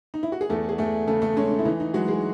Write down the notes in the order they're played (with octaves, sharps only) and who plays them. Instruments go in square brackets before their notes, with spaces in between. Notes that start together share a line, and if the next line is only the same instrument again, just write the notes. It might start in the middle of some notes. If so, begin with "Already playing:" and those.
[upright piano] D#4
E4
F#4
G#4
E2 A3 A4
G#4
E2 A3 A4
C#3 A3 A4
A3 A4
G#3 C#4
C#4
E4
E3 D#4
D#4
F#3 G#3 F#4
G#3 G#4